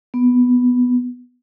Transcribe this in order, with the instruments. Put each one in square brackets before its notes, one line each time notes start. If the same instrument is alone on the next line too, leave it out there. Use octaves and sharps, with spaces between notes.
[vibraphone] B3